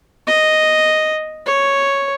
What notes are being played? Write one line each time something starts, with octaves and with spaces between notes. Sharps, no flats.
D#5
C#5